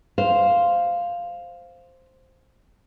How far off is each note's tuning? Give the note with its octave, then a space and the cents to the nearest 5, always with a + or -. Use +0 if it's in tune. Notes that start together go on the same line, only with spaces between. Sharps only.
C5 +0 F5 +0